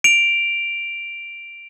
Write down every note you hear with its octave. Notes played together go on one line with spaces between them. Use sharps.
D7 F7